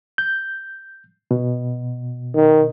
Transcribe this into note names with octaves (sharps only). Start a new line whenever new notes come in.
G6
B2
D#3